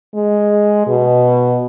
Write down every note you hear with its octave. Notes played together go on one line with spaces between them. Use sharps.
G#3
B2